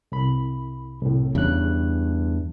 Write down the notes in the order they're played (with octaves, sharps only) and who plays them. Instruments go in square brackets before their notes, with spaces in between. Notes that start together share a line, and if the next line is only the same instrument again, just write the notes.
[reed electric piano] C2 B5
C2 A2
[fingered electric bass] E2 G2 [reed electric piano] C#3 F#6